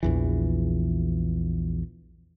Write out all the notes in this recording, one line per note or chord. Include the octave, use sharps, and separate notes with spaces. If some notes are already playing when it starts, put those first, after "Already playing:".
A#1 E2 E3